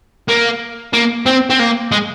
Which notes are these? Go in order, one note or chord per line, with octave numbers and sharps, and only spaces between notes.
A#3
A#3
C4
C4
A#3
G#3